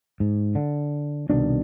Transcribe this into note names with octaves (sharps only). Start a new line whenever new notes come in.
G#2
D3
C2 B2 D#3 D4